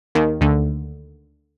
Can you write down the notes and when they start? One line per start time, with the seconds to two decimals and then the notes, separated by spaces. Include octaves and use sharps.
0.15 D#2 D#3
0.41 D2 D3